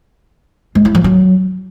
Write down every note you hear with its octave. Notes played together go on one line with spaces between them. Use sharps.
G#3
E4
F3
F#3